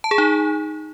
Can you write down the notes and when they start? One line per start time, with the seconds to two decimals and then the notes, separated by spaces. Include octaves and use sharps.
0.04 A5
0.11 G#4
0.18 D#4